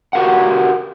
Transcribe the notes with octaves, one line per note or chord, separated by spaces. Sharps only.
F#4 G4 A#4 F5 F#5